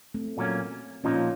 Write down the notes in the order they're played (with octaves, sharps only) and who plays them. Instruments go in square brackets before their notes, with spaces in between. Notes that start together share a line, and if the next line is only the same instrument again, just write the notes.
[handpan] A3 C4
[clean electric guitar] A#2 F#3 A#3 C#4
[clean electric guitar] A#2 F3 A#3 D#4 [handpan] C#4 F4